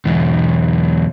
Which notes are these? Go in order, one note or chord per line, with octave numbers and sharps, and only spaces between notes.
B1 E2